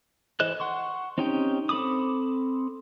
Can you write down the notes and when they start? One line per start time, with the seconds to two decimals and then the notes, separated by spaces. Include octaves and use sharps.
0.40 E3 A4 C5 D#5 F#6
0.60 F#5 C6 C#6
1.18 C4 C#4 D#4 G4 G5
1.69 C4 A4 B5 D6 D#6